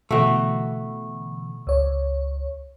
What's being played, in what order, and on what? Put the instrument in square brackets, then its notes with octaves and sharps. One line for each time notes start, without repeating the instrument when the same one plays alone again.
[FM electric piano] B2 D3 E3 [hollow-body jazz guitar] A3 F#4
[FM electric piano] C#2 C#5